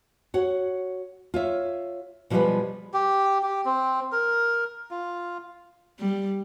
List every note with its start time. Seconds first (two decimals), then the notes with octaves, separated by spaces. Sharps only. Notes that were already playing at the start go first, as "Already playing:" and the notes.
0.34 F#4 C#5 F#5
1.34 F4 C#5 E5
2.30 B2 F3 G3 G#3 F4 B4
2.94 G4
3.43 G4
3.65 C4
4.12 A#4
4.91 F4
5.99 G3